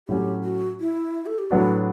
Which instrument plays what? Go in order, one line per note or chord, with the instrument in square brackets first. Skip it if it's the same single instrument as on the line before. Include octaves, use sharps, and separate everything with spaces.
[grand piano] A2 F#3 C#4 [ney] G4
[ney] F#4
E4
A4
G4
[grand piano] A2 F#3 B3 D4 [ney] F#4